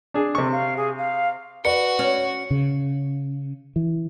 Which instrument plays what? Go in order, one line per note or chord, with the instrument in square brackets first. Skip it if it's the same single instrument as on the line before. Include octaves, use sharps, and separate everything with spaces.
[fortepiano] D4 G#4
[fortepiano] C3 C#6 [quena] A4
[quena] F5
G#4
F5
[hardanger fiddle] F#4 [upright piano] B4 D5 [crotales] C#7
[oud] C#4
[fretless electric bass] C#3
E3